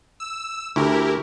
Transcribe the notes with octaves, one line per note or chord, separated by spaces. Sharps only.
E6
D2 E4 G4 A#4